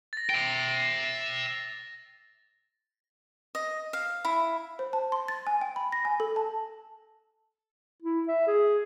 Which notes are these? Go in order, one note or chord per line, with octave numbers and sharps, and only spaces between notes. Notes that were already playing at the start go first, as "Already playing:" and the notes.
A6 A#6
E5 G5
D#5
F5
E4
C5
A5
C6
A6
G#5
G5
B5
A#6
G#5
A4
A5
E4
E5
G#4